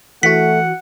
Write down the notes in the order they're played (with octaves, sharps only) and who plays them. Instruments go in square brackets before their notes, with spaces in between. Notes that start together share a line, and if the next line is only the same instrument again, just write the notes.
[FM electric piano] E3 F#4 [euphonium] A3 [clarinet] F#5 [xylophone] B6